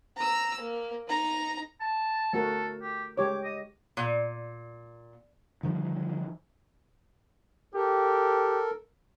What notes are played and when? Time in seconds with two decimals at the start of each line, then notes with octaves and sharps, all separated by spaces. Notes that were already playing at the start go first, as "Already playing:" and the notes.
0.17 A#5 E6
0.60 A#3
1.08 D#4 A#5
1.80 A5
2.33 A3 F#4 A4 A#4
2.82 G4
3.17 G#3 G4 C#5 D6
3.44 D#5
3.97 A#2
5.63 D3 D#3 F3 G3
7.75 G4 A4 A#4